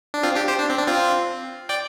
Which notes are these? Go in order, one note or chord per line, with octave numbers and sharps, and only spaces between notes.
D4
C4 F4
D4 G4
G4 C5
D4
C4
D4
C4 F4
D5 G5